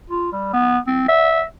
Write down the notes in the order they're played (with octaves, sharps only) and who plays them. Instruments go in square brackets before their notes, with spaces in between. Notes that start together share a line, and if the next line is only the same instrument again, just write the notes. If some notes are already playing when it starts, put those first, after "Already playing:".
[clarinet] F4
G3
B3
C4
E5